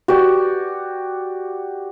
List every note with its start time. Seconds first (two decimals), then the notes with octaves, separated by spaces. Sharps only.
0.08 F#4 G4 D5